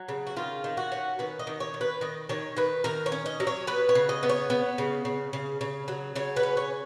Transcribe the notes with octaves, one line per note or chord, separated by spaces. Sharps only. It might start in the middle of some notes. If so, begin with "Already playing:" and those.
Already playing: F#3
C#3
F#4
D#3 F4
D#3
F#4
C#4
D#3 B4
D#5
D#3
C#5
D#3
B4
D#3 D#5
D#3 C#5
D#3 B4
D#3 A#4
C#5
C#4
D#5
F#3
C#5
B3 B4
C#5
C#3
D#5
B3
C#5
B3
C#3
C#3
C#3
C#3
F#3
C#3 C#5
B4
C#4
C#5